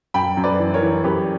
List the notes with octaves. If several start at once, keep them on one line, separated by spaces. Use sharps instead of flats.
F#2 G5 B5
F#2
B4 D5
E3
A#4 C#5
E3
F#2 G4 B4